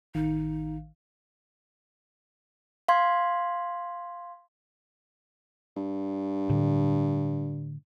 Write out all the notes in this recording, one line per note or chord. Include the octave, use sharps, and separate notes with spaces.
A1 D#3 D#4 F5
F5 C6 G#6
G2
A2 D3